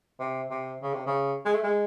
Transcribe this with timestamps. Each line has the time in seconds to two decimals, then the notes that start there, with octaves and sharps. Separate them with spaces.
0.20 C3
0.51 C3
0.82 C#3
0.94 C3
1.06 C#3
1.45 G#3
1.54 A3
1.63 G#3